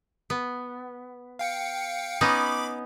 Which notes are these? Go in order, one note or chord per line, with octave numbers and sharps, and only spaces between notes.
B3
F5 G5 C#7
B3 C#4 D#4 B5 D6